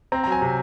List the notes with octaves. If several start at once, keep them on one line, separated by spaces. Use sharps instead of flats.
C4 A#5
A#5
F#3 G#5
C3